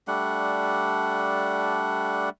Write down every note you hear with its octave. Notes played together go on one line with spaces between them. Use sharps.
G3 A3 D4 F#5